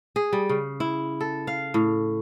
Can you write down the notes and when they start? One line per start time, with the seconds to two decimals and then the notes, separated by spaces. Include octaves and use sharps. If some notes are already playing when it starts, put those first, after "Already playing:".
0.16 G#4
0.33 G3
0.49 C#3
0.80 E4
1.21 A4
1.47 F5
1.74 A2